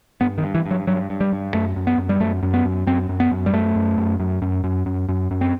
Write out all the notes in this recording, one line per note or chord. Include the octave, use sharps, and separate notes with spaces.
G2 B3
D#3
G2
E3
G2
F#3
G2 F#3
G2
G3
G2
F#2 A3
F#2
B3
F#2
G3
F#2 A3
F#2
B3
F#2
F#2 C4
F#2
B3
F#2
G3
F#2 A3
F#2
F#2
F#2
F#2
F#2
F#2
F#2
F#2
C4